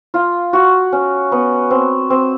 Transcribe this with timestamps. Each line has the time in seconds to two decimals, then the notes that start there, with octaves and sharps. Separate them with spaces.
0.14 F4
0.53 F#4
0.92 C#4
1.32 B3
1.71 C4
2.10 C4